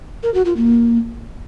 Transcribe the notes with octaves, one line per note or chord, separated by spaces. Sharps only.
A#4
F#4
F4
A#3